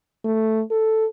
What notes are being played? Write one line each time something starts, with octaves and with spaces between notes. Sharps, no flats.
A3
A4